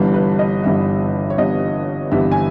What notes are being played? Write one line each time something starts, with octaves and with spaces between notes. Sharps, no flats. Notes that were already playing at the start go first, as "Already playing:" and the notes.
Already playing: G1 G2 E3 G3 B3
B4
D#5
G1 G2 E3 G3 B3 E5
C#5
G1 G2 E3 G3 B3 D#5
G1 G2 E3 G3 B3 E5
G#5